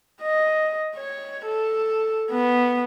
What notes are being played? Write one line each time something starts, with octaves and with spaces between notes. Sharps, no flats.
D#5
C#5
A4
B3